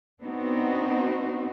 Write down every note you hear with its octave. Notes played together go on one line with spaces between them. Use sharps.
B3 C4 D4 D#4 F#4